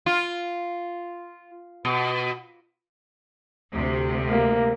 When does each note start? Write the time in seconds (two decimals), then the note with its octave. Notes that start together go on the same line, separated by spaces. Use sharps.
0.06 F4
1.85 B2
3.73 D2 C3
4.28 A#3